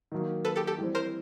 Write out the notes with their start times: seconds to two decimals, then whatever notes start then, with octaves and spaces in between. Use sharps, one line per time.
0.12 D#3 F#3 A#3
0.45 A4 B4
0.56 G4 A4
0.67 G4 A4
0.78 E3 G3 C4
0.95 A#4 C5